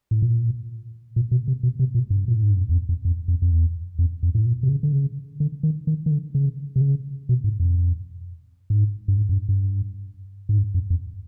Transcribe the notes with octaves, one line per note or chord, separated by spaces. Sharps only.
A2
A#2
A#2
B2
C3
B2
C3
A#2
G2
A#2
A2
G#2
G2
F#2
E2
F2
F2
F2
F2
F2
E2
F2
F2
A2
A#2
C3
C#3
D3
C#3
D3
D#3
D#3
D#3
D3
C#3
C3
C#3
B2
G#2
F2
G#2
G2
G#2
F#2
G2
G2
G#2
G2
F#2
F2